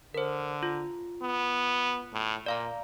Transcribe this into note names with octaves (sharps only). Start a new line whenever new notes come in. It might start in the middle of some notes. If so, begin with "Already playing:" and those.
D3 A#4 C5
F4
B3
A2
A#2 D5 F5 A#5